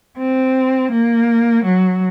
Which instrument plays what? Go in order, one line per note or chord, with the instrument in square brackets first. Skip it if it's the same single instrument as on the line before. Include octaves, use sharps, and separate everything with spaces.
[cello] C4
A#3
F#3